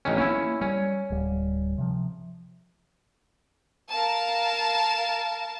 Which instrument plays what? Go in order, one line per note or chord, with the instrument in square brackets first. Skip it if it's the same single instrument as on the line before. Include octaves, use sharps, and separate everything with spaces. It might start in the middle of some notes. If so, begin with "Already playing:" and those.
[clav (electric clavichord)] A1 D#3 C#4
[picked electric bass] A#3 [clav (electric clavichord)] C#4 E4
[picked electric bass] G3 [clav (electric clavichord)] C#4
[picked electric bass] D1 G3
C3 F3
[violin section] A#4 F5 A5